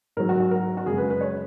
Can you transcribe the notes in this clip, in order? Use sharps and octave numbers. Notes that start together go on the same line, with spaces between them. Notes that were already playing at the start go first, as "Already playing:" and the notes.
G#2 F#3 A#4
F#4
F#4
A#4
F#4
F#2 C#3 G#3 G#4
B4
B4
C#5